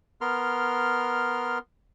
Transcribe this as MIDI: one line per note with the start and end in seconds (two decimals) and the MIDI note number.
0.21 1.58 59
0.21 1.58 70
0.21 1.58 84
0.21 1.58 89